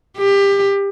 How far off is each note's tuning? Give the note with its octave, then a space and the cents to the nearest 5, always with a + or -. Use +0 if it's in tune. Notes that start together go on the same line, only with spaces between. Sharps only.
G4 +25